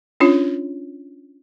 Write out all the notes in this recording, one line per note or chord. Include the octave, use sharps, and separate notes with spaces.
C#4 D4 F4 C#5